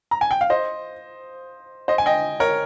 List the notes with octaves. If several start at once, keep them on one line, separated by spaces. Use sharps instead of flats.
A#5
G#5
G5
F5
C5 D#5
C5 D#5
G#5
D#5 G5
A#4 C#5